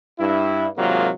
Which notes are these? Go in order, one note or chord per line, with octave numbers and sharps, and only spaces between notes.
G2 E4
G#1 C3 F#3 G#3 A#3 F4